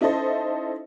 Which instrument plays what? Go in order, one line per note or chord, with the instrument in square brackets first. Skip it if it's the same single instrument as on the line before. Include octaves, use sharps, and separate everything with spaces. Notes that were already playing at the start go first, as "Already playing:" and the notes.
[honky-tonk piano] C#4 D#4 E4 A4 C5 D#5